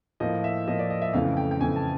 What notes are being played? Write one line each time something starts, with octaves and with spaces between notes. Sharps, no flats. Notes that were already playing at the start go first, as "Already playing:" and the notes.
A2 F3 A#3 D#5
E5
A2 F3 A#3 D#5
D5
D#5
E5
F2 C#3 E3 A3 F5
G5
G5
F2 C#3 E3 A3 G#5
A5